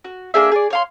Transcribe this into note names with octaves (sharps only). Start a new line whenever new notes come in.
F#4
A#3 D4 G#4 E5
G#4 D5
C#5 F5 C6